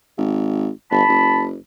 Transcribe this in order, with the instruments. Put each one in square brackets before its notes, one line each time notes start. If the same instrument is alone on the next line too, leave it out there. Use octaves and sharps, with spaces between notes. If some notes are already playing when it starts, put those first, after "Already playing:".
[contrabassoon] G#1
[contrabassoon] G1 [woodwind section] A5 B5
[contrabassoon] F#1